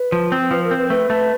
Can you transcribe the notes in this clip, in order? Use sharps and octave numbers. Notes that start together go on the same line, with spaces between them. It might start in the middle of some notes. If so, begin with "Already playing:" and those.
Already playing: B4
F3
C4
F3 B4
A#4
C4
B4
A3 B4
A3